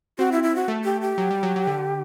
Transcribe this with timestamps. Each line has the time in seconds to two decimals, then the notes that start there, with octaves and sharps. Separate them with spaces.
0.18 C4 F#4
0.32 E4
0.43 E4
0.56 F#4
0.68 A3
0.84 G4
1.01 G4
1.18 F#3
1.30 G3
1.43 F#3
1.56 F#3
1.67 D3